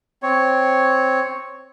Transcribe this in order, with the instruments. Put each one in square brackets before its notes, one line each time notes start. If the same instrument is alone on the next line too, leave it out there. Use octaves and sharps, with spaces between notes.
[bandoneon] C4 C#5